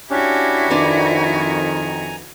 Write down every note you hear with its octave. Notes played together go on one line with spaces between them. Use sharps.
C#4 D4 E4 F#4 G4
F2 D#3 D4 B4 C5 G#5 A#5